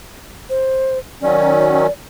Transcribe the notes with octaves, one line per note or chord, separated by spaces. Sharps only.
C5
D#3 F#3 C#4 D5